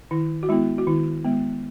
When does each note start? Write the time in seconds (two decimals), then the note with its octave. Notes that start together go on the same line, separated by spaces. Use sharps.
0.11 D#3 E4
0.43 F#4
0.49 G#3 B3 E4
0.78 F#4
0.87 D#3 E4
1.24 G#3 B3